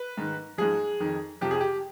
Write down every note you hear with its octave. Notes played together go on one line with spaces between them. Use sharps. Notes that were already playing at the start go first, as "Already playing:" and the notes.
Already playing: B4
G#2 D#3
G#2 F3 G#4
F2 D#3
F2 C3 F3 G4
G#4
G4